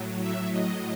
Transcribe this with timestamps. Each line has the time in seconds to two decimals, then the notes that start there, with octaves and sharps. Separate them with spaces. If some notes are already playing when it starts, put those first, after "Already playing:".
Already playing: A2 F#3
0.19 E5
0.51 D#5